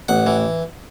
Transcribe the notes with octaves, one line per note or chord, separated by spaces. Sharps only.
A1 F#5
E3